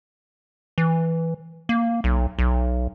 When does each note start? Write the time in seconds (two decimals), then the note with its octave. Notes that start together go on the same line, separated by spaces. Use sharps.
0.78 E3
1.69 A#3
2.04 B1
2.39 B1